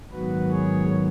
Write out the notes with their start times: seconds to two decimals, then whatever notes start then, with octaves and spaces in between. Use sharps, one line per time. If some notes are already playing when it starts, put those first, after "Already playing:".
0.12 G#2 D#3 F#3 B3 F#4 B4
0.50 G#4 C#5